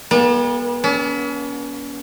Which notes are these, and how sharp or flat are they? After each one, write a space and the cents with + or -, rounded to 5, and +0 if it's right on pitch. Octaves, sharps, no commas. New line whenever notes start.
G3 +40 B3 -40 A4 +10
C#4 +40 A4 -30